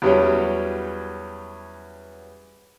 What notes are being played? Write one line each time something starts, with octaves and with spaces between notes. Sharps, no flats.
E2 F#3 G3 C#4